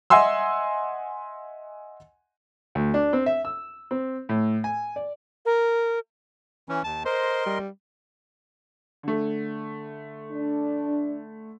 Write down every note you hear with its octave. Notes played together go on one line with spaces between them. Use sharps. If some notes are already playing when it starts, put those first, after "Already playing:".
D#5 E5 F#5 G#5 C6 E6
D2
D4
C4
E5
E6
C4
A2
G#5
D5
A#4
E3 C#4
D#2 A5
A#4 C5 D#5 C6
G3
D3 A3
D4